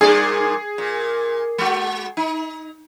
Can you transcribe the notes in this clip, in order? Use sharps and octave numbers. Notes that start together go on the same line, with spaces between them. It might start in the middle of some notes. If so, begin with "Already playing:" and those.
G2 A#2 G#4 D5
A#2
G#3 F#4
D#4